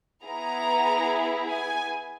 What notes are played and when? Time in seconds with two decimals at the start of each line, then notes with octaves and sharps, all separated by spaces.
0.24 B3 E4 G#4 A#5
1.48 G#5